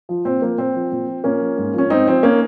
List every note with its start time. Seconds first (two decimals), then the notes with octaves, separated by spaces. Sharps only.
0.09 F3
0.25 A#2 C4
0.42 F3 A#3
0.58 A#2 C4
0.75 F3
0.92 A#2
1.08 F3
1.24 A#2 A#3 C#4
1.41 F3
1.58 G#2
1.74 F3 C#4
1.90 G#2 C4 D#4
2.07 F3 C4
2.23 A#3 C#4